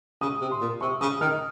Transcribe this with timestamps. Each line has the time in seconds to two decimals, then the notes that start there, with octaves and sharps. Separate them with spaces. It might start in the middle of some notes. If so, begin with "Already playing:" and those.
0.21 C#3 D#6
0.41 C3
0.51 C6
0.61 A#2
0.81 C3 C#6
1.01 C#3 D#6
1.21 D#3 F6